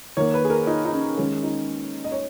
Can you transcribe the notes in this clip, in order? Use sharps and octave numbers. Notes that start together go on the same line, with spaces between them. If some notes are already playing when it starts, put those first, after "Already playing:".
D#3 A#3 C#5
B4
G#4
A#4
D#4
D#4
C#4
D#3 G#3 C#4
D#4
D#5
C#5